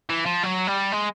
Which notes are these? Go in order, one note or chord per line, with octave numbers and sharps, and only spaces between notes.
E3
F3
F#3
G3
G#3